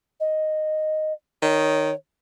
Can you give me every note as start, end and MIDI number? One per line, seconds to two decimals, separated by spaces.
0.20 1.13 75
1.42 1.91 51
1.42 1.95 73